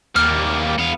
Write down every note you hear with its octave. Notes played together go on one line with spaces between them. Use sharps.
D#2 G3 A#3 F6
E2 B3 F5